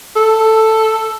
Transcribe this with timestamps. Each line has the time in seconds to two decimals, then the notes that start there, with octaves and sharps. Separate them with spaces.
0.16 A4